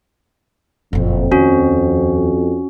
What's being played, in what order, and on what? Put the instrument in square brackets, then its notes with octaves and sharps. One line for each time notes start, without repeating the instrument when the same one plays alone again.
[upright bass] F#1 A#2 [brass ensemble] F2
[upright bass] D#2 [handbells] C#4 F#4